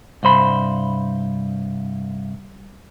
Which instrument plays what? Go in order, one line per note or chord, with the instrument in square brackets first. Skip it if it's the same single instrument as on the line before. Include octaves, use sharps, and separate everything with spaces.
[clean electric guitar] C2 G2 C5 B5